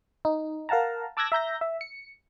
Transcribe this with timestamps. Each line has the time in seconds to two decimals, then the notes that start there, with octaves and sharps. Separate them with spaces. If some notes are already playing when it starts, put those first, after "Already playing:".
0.25 D#4
0.69 A#4 F5 F#5 A5 A#5
1.17 A5 D6 E6 F#6 G#6 A#6
1.32 E5 A#5 G6 A#6
1.61 E5
1.81 C#7